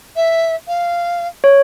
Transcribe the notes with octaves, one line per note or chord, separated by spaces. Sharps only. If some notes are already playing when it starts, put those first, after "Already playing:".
E5
F5
C#5